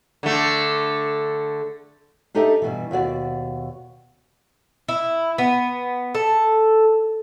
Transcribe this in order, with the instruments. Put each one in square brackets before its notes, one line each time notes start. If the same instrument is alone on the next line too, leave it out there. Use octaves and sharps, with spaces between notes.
[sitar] D3 A3
[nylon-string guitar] D4 D#4 G4 A4 D#5 E5
G2 B2 E3
D#2 B2 F#4 D5
[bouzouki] E4
B3
A4